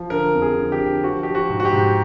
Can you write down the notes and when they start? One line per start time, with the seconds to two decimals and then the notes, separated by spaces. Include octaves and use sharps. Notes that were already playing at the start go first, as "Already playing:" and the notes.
Already playing: F3
0.10 D3 A#4
0.35 F2
0.42 G#4
0.57 D3
0.72 G4
0.80 D3
1.04 F3 F#4
1.23 F3 G4
1.35 F#4
1.50 G#2
1.60 F#4
1.65 G4
1.73 G#2